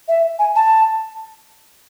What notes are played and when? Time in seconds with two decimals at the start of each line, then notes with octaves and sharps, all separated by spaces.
0.08 E5
0.39 G#5
0.56 A5